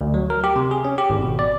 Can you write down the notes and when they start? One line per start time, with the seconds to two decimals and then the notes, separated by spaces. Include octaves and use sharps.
0.01 D2
0.14 F#3
0.30 A#4
0.44 G4
0.56 C3
0.71 G#4
0.85 C#4
0.98 G4
1.10 G#1
1.22 B2
1.39 D5